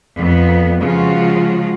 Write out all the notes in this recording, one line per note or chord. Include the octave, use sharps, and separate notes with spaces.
F2 B3
C#3 F3 G#3 F4 F#4